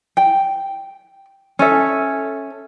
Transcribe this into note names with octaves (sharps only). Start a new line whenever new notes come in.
G5
C#4 A4 E5